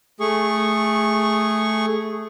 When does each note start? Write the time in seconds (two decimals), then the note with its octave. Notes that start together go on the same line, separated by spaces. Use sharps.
0.20 A3 G#4 C#6